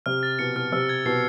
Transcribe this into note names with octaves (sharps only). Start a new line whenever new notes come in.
C3 F6
A6
B2 C#7
B2 F6
C3 E6
G#6
B2 C7